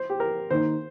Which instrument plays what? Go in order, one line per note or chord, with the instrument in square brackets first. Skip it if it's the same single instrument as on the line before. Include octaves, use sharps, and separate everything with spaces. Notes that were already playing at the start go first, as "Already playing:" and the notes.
Already playing: [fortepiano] C5
G4
A#4
[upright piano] D#3 A#3 D#4 [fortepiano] C5